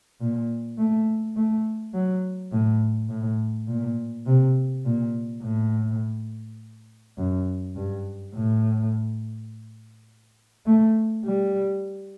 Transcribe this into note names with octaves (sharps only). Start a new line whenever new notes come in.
A#2
A3
A3
F#3
A2
A2
A#2
C3
A#2
A2
F#2
G2
A2
A3
G3